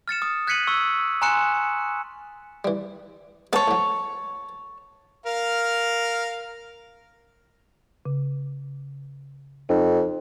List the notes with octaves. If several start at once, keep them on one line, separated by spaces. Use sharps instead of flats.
F6 A6 C#7 E7
D#6
F#6 G#6 B6 C#7 D#7 F#7
C#6 E6
G#5 A#5 C6 F#6 C#7 E7
E3 G3
G#3 B3 C4 C#5 A5
A2 F#3
A#4 F5
C#3
F2 D#4